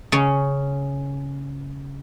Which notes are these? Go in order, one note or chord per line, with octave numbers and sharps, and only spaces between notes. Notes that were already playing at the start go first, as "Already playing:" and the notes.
C#3 C#4